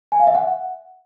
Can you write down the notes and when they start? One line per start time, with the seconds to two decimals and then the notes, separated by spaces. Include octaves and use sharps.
0.12 G#5
0.20 F5
0.27 E5
0.35 F#5